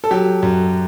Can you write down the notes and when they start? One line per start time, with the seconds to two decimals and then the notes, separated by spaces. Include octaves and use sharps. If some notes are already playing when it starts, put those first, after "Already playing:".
0.04 A4
0.11 F#3 G4
0.43 F#2